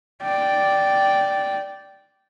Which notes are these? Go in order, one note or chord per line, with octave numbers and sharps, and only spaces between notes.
D5 G5